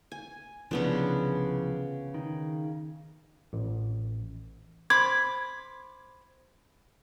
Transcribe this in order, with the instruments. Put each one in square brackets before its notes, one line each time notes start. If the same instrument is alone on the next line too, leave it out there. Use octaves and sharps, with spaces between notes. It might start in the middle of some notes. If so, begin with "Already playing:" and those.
[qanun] G#5
[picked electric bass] C2 E3 F3 [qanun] C#3 B3 D4
[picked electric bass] D#3
[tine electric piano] A1
[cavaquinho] C5 B5 D6 [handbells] G#6